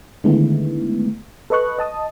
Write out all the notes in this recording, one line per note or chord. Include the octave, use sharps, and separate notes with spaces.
D3 D#3 G#3 A3 B3 E4
A4 B4 D#5 C#6 F#6
D#5 A5 D#6